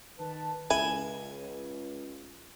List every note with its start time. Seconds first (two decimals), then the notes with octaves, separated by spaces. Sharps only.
0.19 D#3 B4 A5
0.70 C#2 E4 G#5